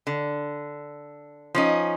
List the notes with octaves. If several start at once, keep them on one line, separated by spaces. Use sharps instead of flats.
D3
F3 C#4 D#4